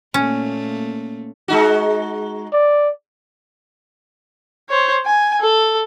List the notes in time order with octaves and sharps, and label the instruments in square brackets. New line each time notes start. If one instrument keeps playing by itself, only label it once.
[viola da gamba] A#2 A3 A#3 [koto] C#4
[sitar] G#3 D#4 F#4
[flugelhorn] D5
[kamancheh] C5 C#5
G#5
A4